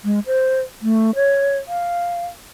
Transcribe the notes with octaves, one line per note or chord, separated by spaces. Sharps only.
G#3
C5
A3
C#5
F5